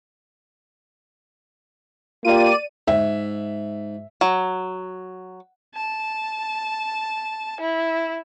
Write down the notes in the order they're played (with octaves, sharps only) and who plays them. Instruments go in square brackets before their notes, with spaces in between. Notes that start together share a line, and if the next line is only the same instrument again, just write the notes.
[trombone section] A#3 F4 G4 [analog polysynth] D5 D#7
[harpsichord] G#2 [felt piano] E5
[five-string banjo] F#3
[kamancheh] A5
E4